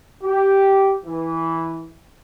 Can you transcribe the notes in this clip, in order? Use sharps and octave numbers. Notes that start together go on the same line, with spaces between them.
G4
E3